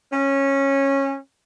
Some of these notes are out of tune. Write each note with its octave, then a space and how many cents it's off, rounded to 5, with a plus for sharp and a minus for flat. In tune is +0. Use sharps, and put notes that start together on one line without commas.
C#4 -15